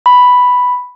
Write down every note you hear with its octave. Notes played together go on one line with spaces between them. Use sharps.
B5